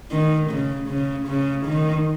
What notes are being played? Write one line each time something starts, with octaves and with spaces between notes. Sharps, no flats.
D#3
C#3
C#3
C#3
D#3